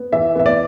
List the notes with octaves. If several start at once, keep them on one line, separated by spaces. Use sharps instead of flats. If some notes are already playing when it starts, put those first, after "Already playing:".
Already playing: B3
E3 E5
B3 E5
D5